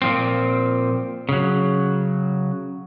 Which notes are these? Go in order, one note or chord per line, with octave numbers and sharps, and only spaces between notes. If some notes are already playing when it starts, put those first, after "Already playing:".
A#2 F3 C4
C#3 F#3